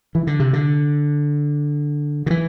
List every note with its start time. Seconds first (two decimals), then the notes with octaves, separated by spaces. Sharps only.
0.15 E3
0.27 D3
0.40 C3
0.53 D3
2.26 D3
2.30 E3